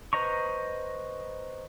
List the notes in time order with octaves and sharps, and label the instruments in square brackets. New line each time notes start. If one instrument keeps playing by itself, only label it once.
[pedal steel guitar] B4 C5 D#5 A#5 C#6